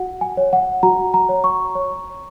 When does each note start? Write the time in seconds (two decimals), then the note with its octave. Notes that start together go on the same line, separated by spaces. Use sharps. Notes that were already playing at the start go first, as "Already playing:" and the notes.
Already playing: F#4 F#5
0.21 G#5
0.37 C#5
0.53 F#5
0.83 F#4 A#5
1.14 A#5
1.29 C#5
1.44 C#6
1.75 C#5